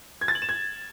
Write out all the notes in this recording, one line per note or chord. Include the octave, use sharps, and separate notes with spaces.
G#6
A6
F#7
E7
G#6